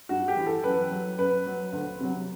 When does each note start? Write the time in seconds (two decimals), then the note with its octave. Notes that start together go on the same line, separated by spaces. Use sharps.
0.09 G2 F#4
0.28 G4
0.37 E3
0.46 A4
0.64 F#2 B4
0.91 F#3
1.18 F#2 B4
1.46 F#3
1.73 D2
2.00 C3 F#3